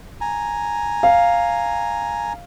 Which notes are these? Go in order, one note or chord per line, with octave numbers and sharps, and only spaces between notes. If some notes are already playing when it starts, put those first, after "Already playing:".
G#5 A#5
F5